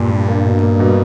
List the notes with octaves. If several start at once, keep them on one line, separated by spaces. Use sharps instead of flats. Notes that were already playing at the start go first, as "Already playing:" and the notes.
Already playing: G2 A#2
A#2
A#3
B2
A#3
B2